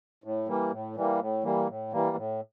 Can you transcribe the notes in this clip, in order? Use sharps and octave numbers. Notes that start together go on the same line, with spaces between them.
A2
E3 G3 A#3
A2
E3 G3 A#3
A2
E3 G3 A#3
A2
E3 G3 A#3
A2